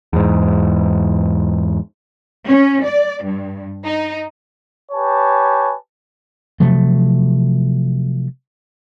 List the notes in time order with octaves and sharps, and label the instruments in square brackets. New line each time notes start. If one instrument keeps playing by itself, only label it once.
[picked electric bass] E2 G#2
[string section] C#4
D5
G2
D#4
[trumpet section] G4 B4 C#5 G#5 A5
[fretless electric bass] C3 F3 F#3 A3